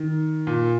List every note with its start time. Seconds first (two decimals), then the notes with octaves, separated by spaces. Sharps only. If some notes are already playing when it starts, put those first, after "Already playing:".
Already playing: D#3
0.47 A#2